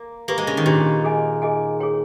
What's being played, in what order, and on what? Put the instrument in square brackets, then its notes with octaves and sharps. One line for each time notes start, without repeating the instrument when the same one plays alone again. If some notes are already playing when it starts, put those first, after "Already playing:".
Already playing: [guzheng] A#3
[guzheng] A#3 [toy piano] G4 B4 G5 B5
[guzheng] G#3
C#3
D#3
[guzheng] A#2 [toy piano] G4 B4 G5 B5
[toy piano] G#4 D#5 G#5
G#4 D#5 G#5
G#4 C#5 G5